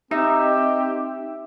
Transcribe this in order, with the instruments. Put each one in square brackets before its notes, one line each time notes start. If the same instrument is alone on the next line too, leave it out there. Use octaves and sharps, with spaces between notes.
[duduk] C4 [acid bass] D#4 [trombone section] G4 [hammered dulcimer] E5